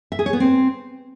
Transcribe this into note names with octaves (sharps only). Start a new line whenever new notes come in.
E5
G#4
C#5
B3
C4